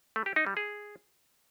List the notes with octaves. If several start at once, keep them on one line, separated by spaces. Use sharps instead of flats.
A3
G4
D#4
G3
G#4